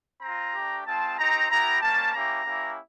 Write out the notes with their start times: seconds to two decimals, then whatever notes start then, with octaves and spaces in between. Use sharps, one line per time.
0.21 C4 F4 A#5
0.54 A3 D4 G4
0.86 G#3 C4 F4 A5
1.17 C4 D#4 G4 A#5
1.49 B3 E4 G4 A#5
1.81 G3 A#3 C#4 A5
2.13 A#3 C#4 E4 G4 A#5
2.45 A#3 C#4 E4 G4